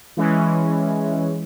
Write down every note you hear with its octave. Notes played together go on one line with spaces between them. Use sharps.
E3 G#3 C#4